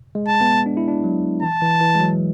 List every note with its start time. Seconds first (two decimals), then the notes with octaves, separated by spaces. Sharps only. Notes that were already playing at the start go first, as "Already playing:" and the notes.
0.15 G#3
0.28 A5
0.41 B3
0.66 D4
0.77 E4
0.88 D4
1.04 F#3
1.42 E3 A5
1.62 E3
1.81 E3
1.95 G#3
2.00 F#3